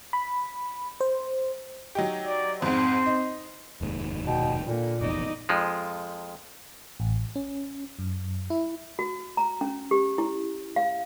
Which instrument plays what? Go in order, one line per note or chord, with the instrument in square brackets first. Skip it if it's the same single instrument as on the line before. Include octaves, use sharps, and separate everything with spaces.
[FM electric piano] B5
C5
[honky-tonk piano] F#3 D#4 G4
[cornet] D5
[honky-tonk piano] F2 G#2 [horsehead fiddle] C4 [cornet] C5
[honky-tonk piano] D#4
[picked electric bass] F1 D#2 G#2
[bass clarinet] B2 [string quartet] G5
[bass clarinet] A#2 [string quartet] D3 A#3
[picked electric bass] F1 A#1 E2 [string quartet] D#4 D5 D#5
[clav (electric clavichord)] F2 F3 G#3
[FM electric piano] A1
C#4
F#2
E4
[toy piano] F#4
A#5
C#4
G4
E4
F5